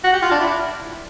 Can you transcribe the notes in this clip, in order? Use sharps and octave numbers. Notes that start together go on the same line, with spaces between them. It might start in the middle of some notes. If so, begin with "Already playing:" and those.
F#4
G4
F4
D4
E4